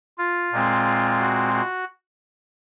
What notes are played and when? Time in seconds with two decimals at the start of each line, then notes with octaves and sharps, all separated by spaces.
0.18 F4
0.52 A#2 G#3 C4
1.20 F#4
1.54 F#4